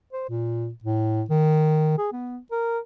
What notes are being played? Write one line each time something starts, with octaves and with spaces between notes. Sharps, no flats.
C5
A#2
A2
D#3
G#4
B3
A#4